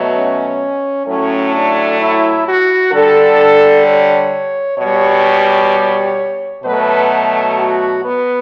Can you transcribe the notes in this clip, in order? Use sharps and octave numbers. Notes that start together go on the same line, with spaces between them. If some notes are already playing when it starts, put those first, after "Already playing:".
Already playing: B2 F#3 A3
C#4
A2 F#3 A3 C#4
D4
E4
F#4
D3 G3 A4
C#5
B2 G3 C#5
B2 F#3 A3 B4
F#4
B3